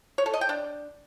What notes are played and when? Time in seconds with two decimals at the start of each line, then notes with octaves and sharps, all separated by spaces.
0.18 C#5
0.26 A4
0.34 D#5
0.41 G5
0.49 D4